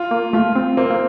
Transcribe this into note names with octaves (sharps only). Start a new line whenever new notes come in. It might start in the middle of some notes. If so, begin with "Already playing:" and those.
Already playing: F4
A#3
A3 F4
C4
A#3 C4
A#3